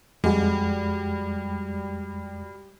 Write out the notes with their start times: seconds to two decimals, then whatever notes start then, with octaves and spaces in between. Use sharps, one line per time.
0.24 F2 G3 G#3 F#4